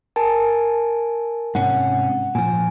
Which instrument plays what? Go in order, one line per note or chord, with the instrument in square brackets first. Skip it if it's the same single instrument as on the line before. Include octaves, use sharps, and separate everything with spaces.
[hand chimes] A#4 G#5 A5
[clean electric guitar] G#2 C3 C#4 [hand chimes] F#5
[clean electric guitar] A#2 F3 [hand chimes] G#5